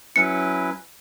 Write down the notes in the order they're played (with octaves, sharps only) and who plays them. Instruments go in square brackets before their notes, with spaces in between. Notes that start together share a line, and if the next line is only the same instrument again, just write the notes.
[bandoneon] F#3 C#4 E4 B4 [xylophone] C#7